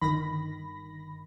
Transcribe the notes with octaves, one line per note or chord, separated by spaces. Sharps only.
G1 D#3 B5 A#6